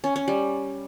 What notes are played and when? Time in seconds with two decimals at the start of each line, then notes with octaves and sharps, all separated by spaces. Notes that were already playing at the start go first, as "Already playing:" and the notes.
0.04 C#4
0.16 C#4
0.28 G3